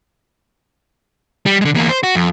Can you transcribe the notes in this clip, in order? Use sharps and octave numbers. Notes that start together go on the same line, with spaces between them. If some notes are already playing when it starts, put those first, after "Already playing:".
G3
D3 G#3
E2 A#3
C5
F#4
F2